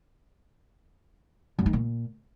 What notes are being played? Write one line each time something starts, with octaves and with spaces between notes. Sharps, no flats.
F#2
D#3
A#2